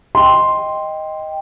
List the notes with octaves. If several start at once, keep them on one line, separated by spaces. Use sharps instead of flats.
D#5 G5 C6